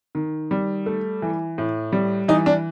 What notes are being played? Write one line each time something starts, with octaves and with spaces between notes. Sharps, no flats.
D#3
G3
A3
E3
A2
G3
E3 D#4
D4